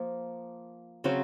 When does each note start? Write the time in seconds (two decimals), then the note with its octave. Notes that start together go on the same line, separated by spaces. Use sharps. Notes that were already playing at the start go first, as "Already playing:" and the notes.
Already playing: F3 A#3
1.04 C#3 F#3 C4 F#4